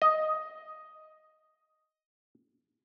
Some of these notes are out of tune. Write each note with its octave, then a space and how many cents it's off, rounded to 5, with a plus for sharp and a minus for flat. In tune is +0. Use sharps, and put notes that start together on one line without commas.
D#5 +5